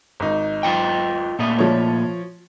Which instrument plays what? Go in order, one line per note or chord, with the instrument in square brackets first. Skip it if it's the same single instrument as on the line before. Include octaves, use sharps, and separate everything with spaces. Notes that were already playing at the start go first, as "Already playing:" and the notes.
[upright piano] G#1 D#4
[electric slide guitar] F4 D#5 G5
A#2 A3 D#5
[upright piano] F3 C#5